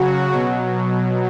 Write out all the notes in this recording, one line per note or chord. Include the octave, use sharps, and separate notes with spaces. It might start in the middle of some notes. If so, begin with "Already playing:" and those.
Already playing: C#3 F#3 F#4
B2 F#3